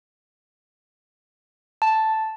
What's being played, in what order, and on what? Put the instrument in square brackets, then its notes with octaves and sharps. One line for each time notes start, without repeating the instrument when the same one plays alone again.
[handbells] A5